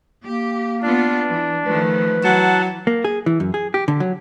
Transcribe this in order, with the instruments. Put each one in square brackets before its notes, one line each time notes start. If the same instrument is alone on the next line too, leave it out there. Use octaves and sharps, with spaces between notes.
[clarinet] A#3 [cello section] G4
[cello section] B3 F4 [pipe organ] D4
[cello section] E3
[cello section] D#3 F3 A3 [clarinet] B4
[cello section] E3 [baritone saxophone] F#3 [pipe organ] F#5 A5
[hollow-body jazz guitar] A#3
G#4
E3
F#2
G#4
G4
D3
F#3